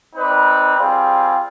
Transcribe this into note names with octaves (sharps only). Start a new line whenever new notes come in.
C4 D#4 B4 D5
G3 C4 F4 G#4